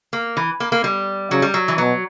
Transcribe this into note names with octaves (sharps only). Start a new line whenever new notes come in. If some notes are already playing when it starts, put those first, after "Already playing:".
A#3
E3
A#3
A#3
G3
C#3 F#3
G3
F#3
E3
B2 F#3